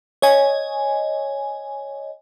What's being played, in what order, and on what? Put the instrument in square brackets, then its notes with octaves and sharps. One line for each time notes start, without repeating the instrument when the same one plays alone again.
[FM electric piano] C#5 D#5 G#5